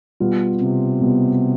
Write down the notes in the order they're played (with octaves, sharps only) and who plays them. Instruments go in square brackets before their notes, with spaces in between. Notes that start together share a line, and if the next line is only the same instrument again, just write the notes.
[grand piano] B2 G3 B3 F4
[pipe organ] C3
[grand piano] B2 G3 B3 F4